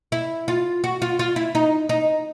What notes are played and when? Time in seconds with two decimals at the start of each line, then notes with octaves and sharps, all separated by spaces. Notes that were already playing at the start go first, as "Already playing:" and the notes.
0.12 E4
0.48 F4
0.84 F#4
1.02 F4
1.19 F4
1.36 E4
1.55 D#4
1.89 D#4